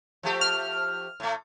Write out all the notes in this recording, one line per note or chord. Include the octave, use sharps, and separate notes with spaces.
F3 A3 G4
F6
A2 A3